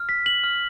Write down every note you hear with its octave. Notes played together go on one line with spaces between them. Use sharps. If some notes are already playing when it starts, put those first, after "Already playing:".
Already playing: F6
B6
F#7
F6